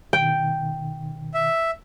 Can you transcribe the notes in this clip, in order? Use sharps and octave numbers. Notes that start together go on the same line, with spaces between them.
B2 D#3 G5
E5